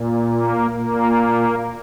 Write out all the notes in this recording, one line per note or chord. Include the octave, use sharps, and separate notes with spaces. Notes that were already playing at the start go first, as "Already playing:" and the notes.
Already playing: A#2
A#3
A#2 A#3